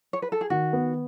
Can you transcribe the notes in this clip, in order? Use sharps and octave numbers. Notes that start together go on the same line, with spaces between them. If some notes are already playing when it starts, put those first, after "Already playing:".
C#5
B4
A4
G#4
D#3 F#4
B3